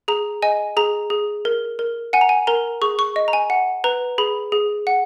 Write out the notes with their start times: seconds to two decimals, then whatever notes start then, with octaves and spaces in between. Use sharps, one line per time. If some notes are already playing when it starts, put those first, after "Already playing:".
0.08 G#4 A#5
0.42 D#5 G#5
0.77 G#4 A#5
1.10 G#4
1.45 A#4
1.79 A#4
2.13 F#5 G#5
2.21 A#5
2.29 G#5
2.47 A#4 A#5
2.82 G#4 C#6
2.99 C#6
3.16 D#5
3.28 A#5
3.33 G#5
3.50 F#5
3.84 B4 A#5
4.18 G#4 B5
4.52 G#4
4.87 F#5